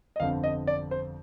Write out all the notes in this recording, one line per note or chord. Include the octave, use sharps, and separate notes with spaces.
D#5
G1 F2 D3 F3 C4 F5
D#5
D5
C5